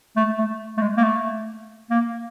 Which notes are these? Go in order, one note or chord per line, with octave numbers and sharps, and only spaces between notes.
A3
A3
A3
G#3
A#3
A3
A#3